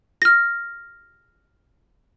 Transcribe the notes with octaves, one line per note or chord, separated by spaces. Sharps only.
F6 A#6